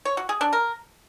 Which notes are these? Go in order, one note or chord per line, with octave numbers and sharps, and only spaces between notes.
C#5
F#4
G#4
D4
A#4